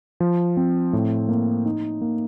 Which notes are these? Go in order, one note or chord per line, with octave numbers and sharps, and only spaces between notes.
F3
C4
A2
A#3
D#4
A#3